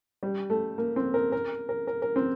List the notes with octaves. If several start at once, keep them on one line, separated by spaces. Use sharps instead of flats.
G3
A3
A#3
C4
A#4
A#4
A#4
A#4
A#4
C4